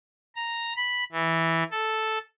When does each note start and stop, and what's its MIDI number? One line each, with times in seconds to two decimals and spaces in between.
0.36 0.74 82
0.76 1.04 83
1.12 1.63 52
1.71 2.19 69